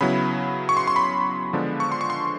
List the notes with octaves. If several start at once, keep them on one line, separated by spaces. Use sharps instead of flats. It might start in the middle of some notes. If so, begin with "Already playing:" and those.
C#3 F#3 B3 E4 B5
C#6
C6
C6
B5
D3 F3 G#3 B3 D4
C#6
C6
C#6
C6